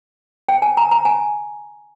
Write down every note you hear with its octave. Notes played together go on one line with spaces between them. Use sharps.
G5
G#5
A#5
A#5
G#5